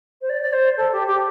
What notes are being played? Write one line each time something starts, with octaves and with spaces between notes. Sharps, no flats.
C5
D5
D5
C5
A4
G4
G4